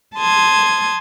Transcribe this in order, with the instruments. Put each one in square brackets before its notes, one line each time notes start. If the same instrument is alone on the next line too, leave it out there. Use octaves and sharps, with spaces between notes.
[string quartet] A5 C6 D#6 G#6